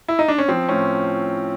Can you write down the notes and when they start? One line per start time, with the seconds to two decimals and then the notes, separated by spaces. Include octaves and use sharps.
0.08 E4
0.19 D#4
0.28 D4
0.38 C#4
0.48 F3 C4
0.69 A2 C#4